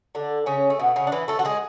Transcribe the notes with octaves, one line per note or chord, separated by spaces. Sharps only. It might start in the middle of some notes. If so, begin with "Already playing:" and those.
D3 D4
C#3 C#4
A3
B2 B3
C#3 C#4
D4
E3 E4
A3 A4
F#4
G#3 G#4